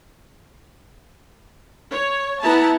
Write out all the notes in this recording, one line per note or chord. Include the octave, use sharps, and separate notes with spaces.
C#5
B3 E4 A5 A#5